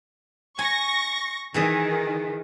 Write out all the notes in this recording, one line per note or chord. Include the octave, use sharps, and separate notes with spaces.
G#5 C#6 A#6
D#3 E3 G#4 E5